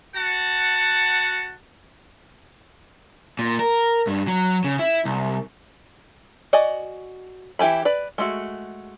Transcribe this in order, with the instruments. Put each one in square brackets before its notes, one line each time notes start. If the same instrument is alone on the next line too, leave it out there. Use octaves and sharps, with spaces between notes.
[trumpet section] F#4 F#5 A5
[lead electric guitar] A#2
A#4
G2
F#3
C#3
E4
C2
[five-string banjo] F#4 D5 D#5 G#5
E3 E4 G4 G#5 B5
B4 D5
G#3 A3 F#4